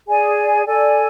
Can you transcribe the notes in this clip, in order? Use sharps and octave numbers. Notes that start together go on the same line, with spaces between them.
G#4 D5 G#5
A4 D5 G#5